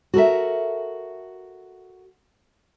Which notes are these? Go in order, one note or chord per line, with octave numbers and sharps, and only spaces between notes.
F#4 A4 A#4 E5